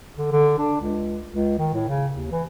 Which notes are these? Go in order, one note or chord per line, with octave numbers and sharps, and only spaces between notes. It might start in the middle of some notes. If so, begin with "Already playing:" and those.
D3
D3
D4
C#2
C#2
D#3
A2
C#3
D#2
E3